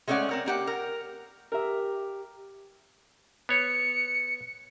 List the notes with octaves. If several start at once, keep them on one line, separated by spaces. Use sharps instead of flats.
G#3 A3 C#4 F#4 D5 F#5
C4 A#4 C#5
A#3 G4 F#5
A#4
G4 A#4 E5
B3 C#5 C#7